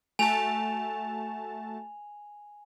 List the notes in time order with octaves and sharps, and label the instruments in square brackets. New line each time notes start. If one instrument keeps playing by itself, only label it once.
[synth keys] A3 F#4 A5 [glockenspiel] G#5 F7